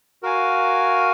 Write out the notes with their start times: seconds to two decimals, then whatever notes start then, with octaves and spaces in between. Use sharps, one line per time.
0.23 F#4 A#4 F5 G#5